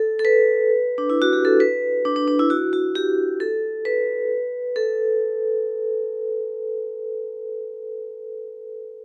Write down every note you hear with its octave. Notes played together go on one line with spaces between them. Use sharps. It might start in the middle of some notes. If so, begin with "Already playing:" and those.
Already playing: A4
A4
B4
D4
E4
F#4
G4
A4
B4
D4
D4
D4
E4
F#4
F#4
G4
A4
B4
A4